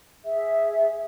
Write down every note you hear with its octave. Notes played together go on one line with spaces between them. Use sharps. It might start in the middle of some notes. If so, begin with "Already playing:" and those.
G#4 E5